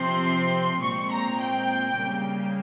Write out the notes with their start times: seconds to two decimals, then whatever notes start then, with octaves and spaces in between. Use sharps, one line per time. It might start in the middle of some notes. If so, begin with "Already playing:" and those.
Already playing: C3 F3 C4 C6
0.82 A#2 G#3 C4 C#6
1.11 A#5
1.39 G5
1.96 C#3 G3 A#3